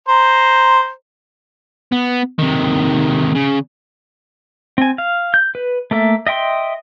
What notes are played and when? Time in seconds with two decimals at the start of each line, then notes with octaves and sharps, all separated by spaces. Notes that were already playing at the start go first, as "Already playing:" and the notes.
0.08 C5 A#5
1.92 B3
2.39 C3 D#3
3.35 C#3
4.78 C4 G#5
4.98 F5
5.34 G6
5.55 B4
5.91 A3 A#3 A4 E5
6.27 D#5 E5 G5 C6